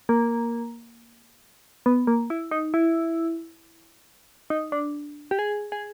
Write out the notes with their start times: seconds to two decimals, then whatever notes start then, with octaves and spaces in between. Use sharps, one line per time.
0.09 A#3
1.86 B3
2.07 A#3
2.30 E4
2.51 D#4
2.74 E4
4.50 D#4
4.72 D4
5.31 G4
5.39 G#4
5.72 G#4